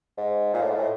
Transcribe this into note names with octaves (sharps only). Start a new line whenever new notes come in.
G#2
A#2
A2
G#2
A2